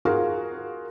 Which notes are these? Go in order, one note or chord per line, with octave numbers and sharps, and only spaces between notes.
F4 F#4 G#4 A#4 F5